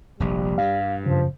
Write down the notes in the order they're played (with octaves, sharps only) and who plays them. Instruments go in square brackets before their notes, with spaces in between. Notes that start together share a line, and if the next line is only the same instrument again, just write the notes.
[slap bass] F1 A#1 [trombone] G3
[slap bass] G2 [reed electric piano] F5
[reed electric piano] F#2 C#3 [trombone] F3